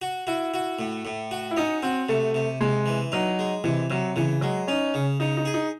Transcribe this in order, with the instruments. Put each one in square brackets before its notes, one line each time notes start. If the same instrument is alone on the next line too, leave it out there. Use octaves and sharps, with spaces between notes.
[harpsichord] F#4
[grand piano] E4 [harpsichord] F#4
[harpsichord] F#4
A2
A2
F#4
[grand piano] E4
[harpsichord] C#4 [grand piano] D#4
[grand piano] C4 [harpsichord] F#4
[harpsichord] C3 [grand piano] A3
[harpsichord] C3
[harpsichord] C3 [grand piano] G#3
[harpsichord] E3
[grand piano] F#3 [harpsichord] D#4
[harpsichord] G#3
[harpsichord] C3 [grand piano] E3
[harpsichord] C3 [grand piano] F#3
[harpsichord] C#3 [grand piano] E3
[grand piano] F#3 [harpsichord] G#3
[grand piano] C#4 [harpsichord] D#4
[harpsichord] C#3
[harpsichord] C#3 [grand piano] D#4
[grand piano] D#4
[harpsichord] G#4
[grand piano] D#4